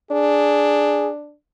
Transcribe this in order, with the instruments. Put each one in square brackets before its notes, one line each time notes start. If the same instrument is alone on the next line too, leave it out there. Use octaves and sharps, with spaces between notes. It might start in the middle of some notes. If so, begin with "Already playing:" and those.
[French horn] D4 [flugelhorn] G#4